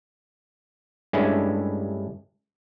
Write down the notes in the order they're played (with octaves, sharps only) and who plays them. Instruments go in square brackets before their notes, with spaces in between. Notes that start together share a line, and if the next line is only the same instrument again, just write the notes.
[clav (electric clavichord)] G2 G#3 A3 C#4 D4 E4